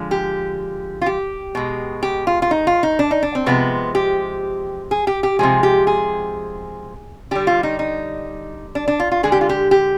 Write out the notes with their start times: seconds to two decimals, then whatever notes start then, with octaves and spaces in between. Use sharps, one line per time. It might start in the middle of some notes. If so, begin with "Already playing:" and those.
Already playing: D3 F3 G#3
0.11 G4
1.02 F4
1.06 G4
1.55 B2 G#3
2.03 G4
2.27 F4
2.42 F4
2.51 D#4
2.67 F4
2.83 D#4
2.99 D4
3.11 D#4
3.23 D4
3.35 C4
3.46 C3 F3 G#3 B3
3.95 G4
4.91 G#4
5.07 G4
5.23 G4
5.39 C3 F3 G#3 G#4
5.63 G4
5.87 G#4
7.31 D3 G3 G4
7.47 F4
7.63 D#4
7.79 D#4
8.75 D4
8.88 D4
9.00 F4
9.12 F4
9.23 D3 G#3 G#4
9.32 G4
9.41 F4
9.49 G4
9.71 G4